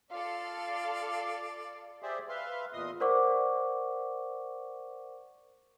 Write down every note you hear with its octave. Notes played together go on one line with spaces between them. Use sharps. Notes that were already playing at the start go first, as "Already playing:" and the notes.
F4 A4 D5 F5
G4 G#4 C5 D5 E5
B4 E5 F5 C6
E2 A#2 D#5 C6 D#6
A#4 C5 D5 F#5 C#6 D6